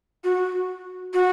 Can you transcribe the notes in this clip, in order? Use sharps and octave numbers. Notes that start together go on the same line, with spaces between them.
F#4
F#4